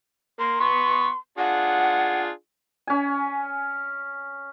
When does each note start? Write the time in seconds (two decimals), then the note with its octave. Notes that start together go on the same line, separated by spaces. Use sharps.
0.39 A#3 C6
0.60 B3 B4 C#6
1.38 D4 F4 G#4 F#5
2.87 C#4 G#5